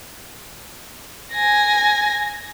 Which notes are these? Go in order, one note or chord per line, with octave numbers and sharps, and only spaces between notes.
G#5 A#6